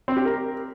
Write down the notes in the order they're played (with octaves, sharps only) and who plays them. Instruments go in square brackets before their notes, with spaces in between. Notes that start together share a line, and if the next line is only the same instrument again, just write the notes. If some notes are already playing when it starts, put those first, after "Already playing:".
[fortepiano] C4
G4
A#4